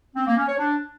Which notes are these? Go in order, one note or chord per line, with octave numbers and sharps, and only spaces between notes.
C4
A#3
C#4
C#5
D4